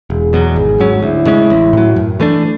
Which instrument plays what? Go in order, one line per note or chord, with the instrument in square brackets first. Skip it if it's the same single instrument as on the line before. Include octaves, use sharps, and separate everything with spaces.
[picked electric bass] E1 [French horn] G#4
[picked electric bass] E2 B2 F#3
[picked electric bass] G#1 [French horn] G#4
[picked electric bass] G#2 F#3 C#4
[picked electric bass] D2 [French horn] E4
[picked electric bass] C#3 G#3 C#4
A1
A2 F#3
F#2
E3 A3 D4